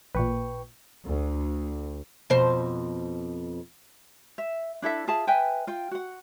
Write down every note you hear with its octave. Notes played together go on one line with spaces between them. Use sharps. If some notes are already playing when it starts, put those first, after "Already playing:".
A1 A#2 B4 G5 C#6
D2
F2 B2 C5
E5
D4 E4 A4 E5
F4 G#4 E5 A5
B4 E5 G5 G#5
F4 G5
F#4 F#5